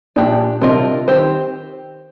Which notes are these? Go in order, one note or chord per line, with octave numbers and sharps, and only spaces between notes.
A#1 A#2 D4 G4 D5
C2 C3 D4 F4 A#4 D#5
D#3 C4 G4 C5